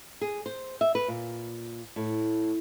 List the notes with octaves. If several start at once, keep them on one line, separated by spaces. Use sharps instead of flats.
G#4
C5
E5
B4
A#2
A2